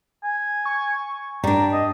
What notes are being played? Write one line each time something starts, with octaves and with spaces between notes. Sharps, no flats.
G#5
C#6
G2 G3 D4 A#5
D#5